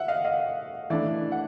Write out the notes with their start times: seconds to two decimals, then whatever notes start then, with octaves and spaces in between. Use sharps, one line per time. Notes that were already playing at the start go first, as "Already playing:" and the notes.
Already playing: E5 F#5
0.08 D#5 F5
0.25 D#5 F5
0.90 E3 A3 D4 D5 E5
1.32 F#5